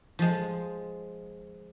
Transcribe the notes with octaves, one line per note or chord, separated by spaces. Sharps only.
F3 G#3